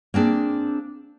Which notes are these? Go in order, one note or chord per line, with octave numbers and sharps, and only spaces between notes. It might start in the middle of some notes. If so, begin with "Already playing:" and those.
A#3 C4 D4 G#4